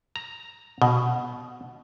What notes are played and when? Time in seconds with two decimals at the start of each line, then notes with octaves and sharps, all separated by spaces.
0.16 A#5
0.82 B2